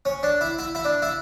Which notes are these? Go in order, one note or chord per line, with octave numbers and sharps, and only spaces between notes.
C#4
D4
E4
E4
E4
D4
E4